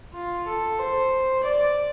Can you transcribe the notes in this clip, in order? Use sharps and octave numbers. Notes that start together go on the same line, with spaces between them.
F4
A4
C5
D5